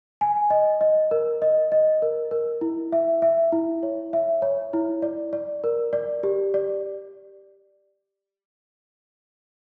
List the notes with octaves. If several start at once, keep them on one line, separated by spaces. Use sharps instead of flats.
G#5
D#5
D#5
A#4
D#5
D#5
A#4
A#4
E4
E5
E5
E4
C#5
E5
C#5
E4
D5
D5
A#4
D5
G4
D5